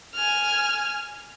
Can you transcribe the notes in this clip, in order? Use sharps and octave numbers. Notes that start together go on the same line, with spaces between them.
G#5 F6